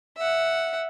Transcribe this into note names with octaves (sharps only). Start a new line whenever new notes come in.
E5 F#5